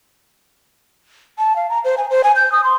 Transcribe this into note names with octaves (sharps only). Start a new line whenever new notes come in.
A5
F5
A#5
C5
G#5
C5
G#5
G6
D#6
C6